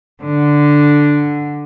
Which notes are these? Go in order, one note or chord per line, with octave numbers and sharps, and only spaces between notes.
D3